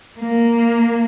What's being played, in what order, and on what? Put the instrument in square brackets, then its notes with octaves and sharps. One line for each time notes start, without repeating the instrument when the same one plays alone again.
[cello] A#3